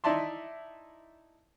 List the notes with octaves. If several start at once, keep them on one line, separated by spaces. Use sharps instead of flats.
D#4 E4 D5 E5 A5 C6